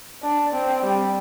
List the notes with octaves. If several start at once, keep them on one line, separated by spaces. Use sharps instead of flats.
D4
C4
G3